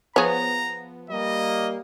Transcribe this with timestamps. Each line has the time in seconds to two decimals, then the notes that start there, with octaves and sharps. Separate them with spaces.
0.16 F3 B3 G#4 C#5 A#5
1.10 G3 A#3 D#5